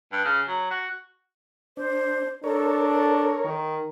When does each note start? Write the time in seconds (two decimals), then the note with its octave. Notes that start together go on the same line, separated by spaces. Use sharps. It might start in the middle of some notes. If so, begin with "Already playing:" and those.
0.12 G2
0.25 C#3
0.48 F#3
0.71 F#4
1.77 D4 C5
2.44 D4 A4 A#4 C#5
3.45 D#3